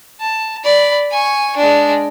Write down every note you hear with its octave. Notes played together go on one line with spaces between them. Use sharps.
A5
D5 B5
G#5 C#6
G#3 D4